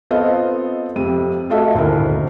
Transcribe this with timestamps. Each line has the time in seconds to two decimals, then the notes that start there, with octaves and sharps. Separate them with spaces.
0.11 B3 C4 F4 A4 D#5 F5
0.96 F2 C3 D#7
1.50 A3 F4 F#4 A4 D#5 E5
1.74 D#1 D2 E4 A#4